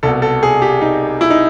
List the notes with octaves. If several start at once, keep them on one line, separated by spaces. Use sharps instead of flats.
C2 B2 A4
A4
G#4
G4
D#4
E4
D#4